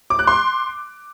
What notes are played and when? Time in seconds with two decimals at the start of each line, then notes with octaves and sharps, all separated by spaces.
0.10 D6
0.19 F#6
0.27 C6